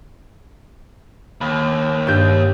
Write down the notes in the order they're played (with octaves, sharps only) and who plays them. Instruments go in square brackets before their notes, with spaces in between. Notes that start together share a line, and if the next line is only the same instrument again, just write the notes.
[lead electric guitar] D#2 [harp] B5
[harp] G2 G4 G6